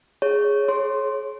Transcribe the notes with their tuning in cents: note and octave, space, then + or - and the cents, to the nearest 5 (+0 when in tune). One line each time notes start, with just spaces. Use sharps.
G#4 +0 C#5 +0
G#4 +40 C#5 -25 C6 +0